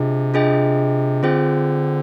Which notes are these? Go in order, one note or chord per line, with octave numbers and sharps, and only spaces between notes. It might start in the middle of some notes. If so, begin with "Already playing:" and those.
Already playing: C3 D4 F4 G#4 D#5 G5
D4 F4 G#4 D#5 G5
D3 C4 F4 G#4 C5 G5